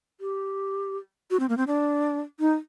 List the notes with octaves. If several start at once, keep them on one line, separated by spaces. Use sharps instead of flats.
G4
F#4
C4
A#3
C4
D4
D#4